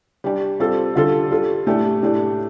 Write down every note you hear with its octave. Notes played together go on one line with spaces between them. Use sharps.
G3 D4 G4
G3 C4 F4 A4
D3 G3 F4 A4
G3 F4 A4
A2 A3 D4 G4
A2 A3 D4 G4